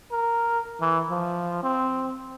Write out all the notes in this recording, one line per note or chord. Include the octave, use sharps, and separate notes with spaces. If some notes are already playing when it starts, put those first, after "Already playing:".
A#4
E3
F3
C4